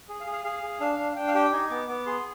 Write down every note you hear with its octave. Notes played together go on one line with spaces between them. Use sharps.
G#4
F5
G#4
F5
G#4 F5
G#4
D4 F5
D4
F5
D4 G5
F5
G4 G5
D#4 G#5
B3 D6
B3 D6
G#4 C6